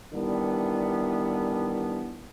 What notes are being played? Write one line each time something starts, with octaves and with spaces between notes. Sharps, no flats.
D#3 E3 G3 B3 D4 E4